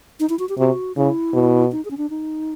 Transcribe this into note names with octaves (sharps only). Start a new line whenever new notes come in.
D#4
E4
F#4
G4
C3 F#4
C#3 E4
B2
D#4
G#4
C#4
D4
D#4